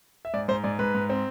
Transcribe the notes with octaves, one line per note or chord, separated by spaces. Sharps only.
E5
G#2 D5
G#2 C5
G#2 D5
G#2 B4
G#2
C4